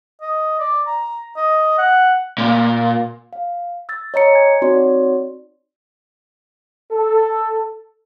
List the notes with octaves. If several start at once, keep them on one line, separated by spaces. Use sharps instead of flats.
D#5
D5
A#5
D#5
F#5
A#2
F5
E6 A6
C#5 D#5 A#5 C#7
G#5 G#6
C4 D#4 F#4 C#5 D5 C6
A4